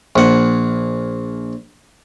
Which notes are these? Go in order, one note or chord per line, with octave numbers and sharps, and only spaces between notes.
A#1 F#5